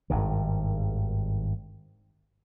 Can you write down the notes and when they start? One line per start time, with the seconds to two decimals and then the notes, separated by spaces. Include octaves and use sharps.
0.10 G#1 G2 D#3